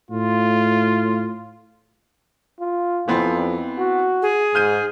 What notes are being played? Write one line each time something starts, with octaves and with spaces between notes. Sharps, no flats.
A2 F4
F4
F2 E3 B3 C4
F#4
G#4
G#2 F6 G6 D#7